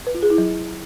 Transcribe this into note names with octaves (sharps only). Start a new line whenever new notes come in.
B4
F4
G#4
E4
F#3